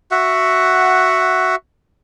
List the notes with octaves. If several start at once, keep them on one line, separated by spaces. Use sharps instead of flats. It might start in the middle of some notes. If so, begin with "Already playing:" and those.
F#4 E5 F#5